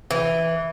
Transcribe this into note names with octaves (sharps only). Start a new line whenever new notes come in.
E3